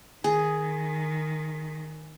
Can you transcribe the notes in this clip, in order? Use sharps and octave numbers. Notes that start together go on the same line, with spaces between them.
D#3 G#4 G#5